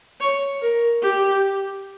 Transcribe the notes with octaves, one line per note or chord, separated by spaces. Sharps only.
C#5
A#4
G4